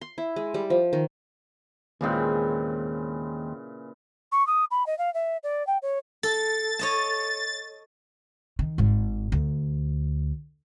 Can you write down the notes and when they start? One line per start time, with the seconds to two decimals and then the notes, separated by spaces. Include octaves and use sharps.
0.01 C6
0.18 E4
0.36 G#3
0.54 G3
0.70 F3
0.93 D#3
2.01 D#2 A#2 C#3 E3 G#3 C4
4.32 C#6
4.47 D#6
4.71 B5
4.86 D#5
4.98 F5
5.14 E5
5.43 D5
5.67 G5
5.82 C#5
6.23 A4 A6
6.79 C#5 D#5 A5
8.59 D#3
8.78 G#1 G#2
9.32 D2